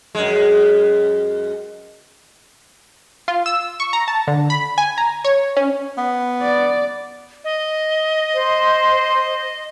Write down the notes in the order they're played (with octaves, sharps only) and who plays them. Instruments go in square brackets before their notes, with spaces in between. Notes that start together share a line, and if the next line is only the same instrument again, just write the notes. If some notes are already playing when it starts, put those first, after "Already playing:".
[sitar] F#2 G#3
[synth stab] F4
E6
C#6
A#5
A5
D3
B5
G#5
A#5
C#5
C#4
[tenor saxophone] B3
[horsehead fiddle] D5
[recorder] D#5
[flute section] C5